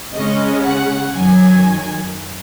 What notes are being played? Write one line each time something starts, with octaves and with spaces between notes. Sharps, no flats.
C#3 G#3 C#4 D#5
F#5
F#2 D#3 F#3 G#5